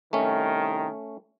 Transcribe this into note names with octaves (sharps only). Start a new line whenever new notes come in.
C2 D#3 A3 C#4